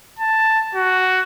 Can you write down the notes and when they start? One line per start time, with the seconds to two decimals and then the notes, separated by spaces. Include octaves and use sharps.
0.19 A5
0.75 F#4